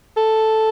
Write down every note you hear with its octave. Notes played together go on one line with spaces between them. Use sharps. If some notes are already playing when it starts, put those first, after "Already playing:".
A4